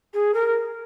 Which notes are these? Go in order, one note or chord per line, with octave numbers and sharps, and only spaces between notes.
G#4
A#4